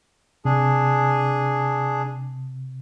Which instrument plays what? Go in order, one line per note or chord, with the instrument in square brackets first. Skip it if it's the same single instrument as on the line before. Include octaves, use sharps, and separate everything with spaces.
[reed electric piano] C3 [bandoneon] D4 G#4